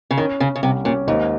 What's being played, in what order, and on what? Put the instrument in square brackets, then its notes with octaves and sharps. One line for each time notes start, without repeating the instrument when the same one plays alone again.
[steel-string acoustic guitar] C#3
[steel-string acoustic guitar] D#3 [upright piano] C#4
[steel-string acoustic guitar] C#3 [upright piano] C#4
[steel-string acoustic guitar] C#3
[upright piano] C2 [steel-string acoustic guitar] C3
[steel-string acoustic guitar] A#2 [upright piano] C#4
[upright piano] D#2 [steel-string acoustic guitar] G#2